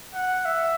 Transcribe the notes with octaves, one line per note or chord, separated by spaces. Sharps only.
F#5
E5